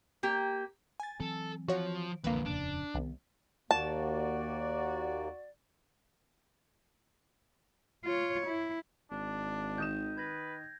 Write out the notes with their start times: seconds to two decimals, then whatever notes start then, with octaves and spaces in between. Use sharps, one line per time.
0.23 A#3 G4
1.00 G#5 A6
1.20 E3 F#3 C4 A4
1.68 F3 F#4 C#5
2.24 C2 F2 D3 E3 A#3 B4
2.45 D#1 F2 C#3 D4
2.94 C2 D#3 B3
3.71 D#2 A#3 F#4 D5 A5
8.05 F4 C#5
8.47 E4
9.11 G#1 D4
9.78 D#3 D#6 G6 E7
10.18 B4 G#6 A#6